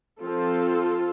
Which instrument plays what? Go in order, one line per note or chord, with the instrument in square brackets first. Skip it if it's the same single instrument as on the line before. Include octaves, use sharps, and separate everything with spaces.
[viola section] F3 C4 F4 A4